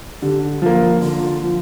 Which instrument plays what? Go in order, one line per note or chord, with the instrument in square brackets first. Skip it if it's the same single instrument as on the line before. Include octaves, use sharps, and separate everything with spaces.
[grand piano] D3 [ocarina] G4
[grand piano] F3 A#3
[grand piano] D3 [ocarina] F4
[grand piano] F3